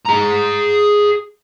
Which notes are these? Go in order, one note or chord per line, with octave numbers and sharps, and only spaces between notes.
G#4 A#5